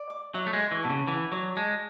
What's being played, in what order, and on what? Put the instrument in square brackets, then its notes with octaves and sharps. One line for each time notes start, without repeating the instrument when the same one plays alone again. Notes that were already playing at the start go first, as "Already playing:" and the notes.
Already playing: [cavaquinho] D5
D6
[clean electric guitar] F#3 [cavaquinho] E5
[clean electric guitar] A3
G#3
[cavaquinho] C#6
[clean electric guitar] E3
[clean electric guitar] B2 [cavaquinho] A5
[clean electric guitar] C#3
[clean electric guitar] E3 [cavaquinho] F#5
[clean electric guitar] F#3 [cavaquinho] D5
[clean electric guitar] G#3 [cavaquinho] A5